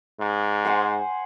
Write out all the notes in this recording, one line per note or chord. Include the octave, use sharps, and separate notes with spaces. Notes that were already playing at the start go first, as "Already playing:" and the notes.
G#2
C5 F#5 G#5